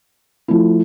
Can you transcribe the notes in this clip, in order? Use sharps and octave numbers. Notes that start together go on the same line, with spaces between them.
F3 A3 E4